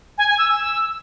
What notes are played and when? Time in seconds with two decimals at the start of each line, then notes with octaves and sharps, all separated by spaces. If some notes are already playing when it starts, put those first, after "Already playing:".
0.18 G#5
0.28 G#5
0.38 E6
0.49 E6